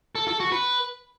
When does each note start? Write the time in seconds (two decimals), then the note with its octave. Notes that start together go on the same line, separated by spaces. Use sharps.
0.15 A4
0.28 A4
0.40 F#4
0.52 B4